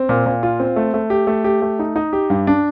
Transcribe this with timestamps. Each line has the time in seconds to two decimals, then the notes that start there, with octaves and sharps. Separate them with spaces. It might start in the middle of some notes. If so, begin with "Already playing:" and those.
Already playing: C4
0.09 A#2
0.26 A#2
0.43 F4
0.60 C4
0.76 A3
0.94 A3
1.10 G4
1.27 A3
1.44 G4
1.62 A3
1.79 D#4
1.96 D#4
2.13 G4
2.30 G2
2.47 D4